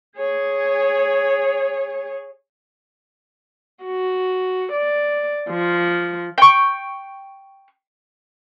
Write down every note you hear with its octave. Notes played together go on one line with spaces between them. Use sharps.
G#4 C#5
F#4
D5
F3
G5 C#6